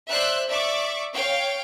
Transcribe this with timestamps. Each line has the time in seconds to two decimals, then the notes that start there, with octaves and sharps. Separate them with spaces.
0.10 C5 D5 E5 E6 F#6
0.49 D5 E5 C#6 D6
1.13 C#5 F5 G5